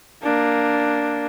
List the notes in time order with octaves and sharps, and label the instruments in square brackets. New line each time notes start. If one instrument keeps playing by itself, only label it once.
[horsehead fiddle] A#3 D4